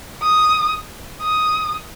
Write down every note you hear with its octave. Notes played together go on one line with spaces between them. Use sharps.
D#6
D#6